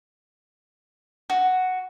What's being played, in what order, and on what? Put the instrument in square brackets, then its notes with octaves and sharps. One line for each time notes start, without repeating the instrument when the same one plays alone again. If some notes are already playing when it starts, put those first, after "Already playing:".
[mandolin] F#4